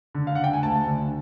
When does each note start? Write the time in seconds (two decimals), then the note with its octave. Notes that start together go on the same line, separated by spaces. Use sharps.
0.14 D3
0.27 F5
0.35 D3 F#5
0.44 G5
0.53 G#5
0.62 D2 A5
0.87 D3